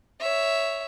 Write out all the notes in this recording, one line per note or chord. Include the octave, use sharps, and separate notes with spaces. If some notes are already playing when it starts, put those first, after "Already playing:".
C#5 E5